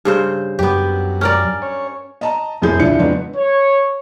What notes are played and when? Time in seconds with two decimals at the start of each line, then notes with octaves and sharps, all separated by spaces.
0.05 G2 C#3 C5
0.59 F#2 B3 G4
1.21 C#4 A#4 D5
1.62 C#5
2.21 D#5 A5 A#5
2.62 F1 F#2 A2 G#4 G6
2.80 D2 A2 C#3 F3 D4 C#7
2.98 F2 F#3 G#3 B3 D4
3.36 C#5